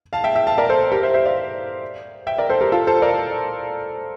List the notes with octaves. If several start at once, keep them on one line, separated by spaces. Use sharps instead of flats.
F5 A5
E5 G5
E5 G5
F5 A5
A#4 D5
A4 C5
G4 A#4
C5 E5
C5 E5
D5 F5
E5 G5
A#4 D5
A4 C5
G4 A#4
F4 A4
A4 C5
A#4 D5